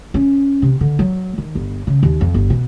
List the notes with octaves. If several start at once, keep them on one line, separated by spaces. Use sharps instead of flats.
C#4
C3
D3
F#3
D#3
G1
C#3
D#2
F2
G1
B2